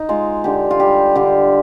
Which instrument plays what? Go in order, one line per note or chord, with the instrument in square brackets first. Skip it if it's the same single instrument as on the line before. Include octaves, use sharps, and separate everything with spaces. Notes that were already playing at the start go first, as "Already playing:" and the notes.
Already playing: [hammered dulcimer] D#4
G#3 F4
D3 G4
F4
G3 G4
D3 G4